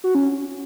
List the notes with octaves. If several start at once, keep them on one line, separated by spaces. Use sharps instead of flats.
F#4
C#4